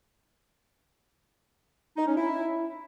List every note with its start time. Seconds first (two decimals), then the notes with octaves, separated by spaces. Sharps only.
1.97 D#4
2.07 C#4
2.16 E4